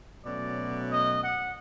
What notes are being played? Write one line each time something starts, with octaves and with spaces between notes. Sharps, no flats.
B2 F#3 A3 C#4 D5
D#5
F#5